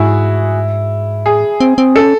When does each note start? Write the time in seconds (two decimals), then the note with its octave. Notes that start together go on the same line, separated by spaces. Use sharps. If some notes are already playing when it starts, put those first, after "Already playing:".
Already playing: G#2 E4 F#4 G#4
1.26 A2 G#4
1.60 C4
1.78 C4
1.95 C#4 A4